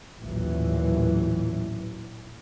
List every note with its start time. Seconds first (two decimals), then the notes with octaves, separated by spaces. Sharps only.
0.20 A1 D#2 A#2 E3 F#3